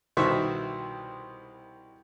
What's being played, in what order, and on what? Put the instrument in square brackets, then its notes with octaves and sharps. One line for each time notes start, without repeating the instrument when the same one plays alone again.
[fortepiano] C2 B2 D#3 C5 E5 C#6